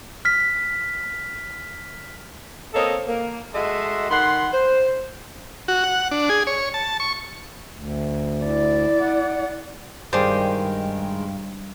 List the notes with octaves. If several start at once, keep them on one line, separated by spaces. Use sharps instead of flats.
F6 B6
A#3 C4 A4 C#5 D#5
A#3
G#3 F#4 A4 D#5 E5 C6
D#3 F#5 B5 C6
C5
F#4
F#5
D4
G#4
C#5
A5
C#6
D2
E4 D5
F#5
G2 D#3 G#3 G4 G#4 A#4 C5 D5